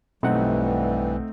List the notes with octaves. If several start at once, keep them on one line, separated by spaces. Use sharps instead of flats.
B1 G2 E3 G3 A3 C4 D#4 F#5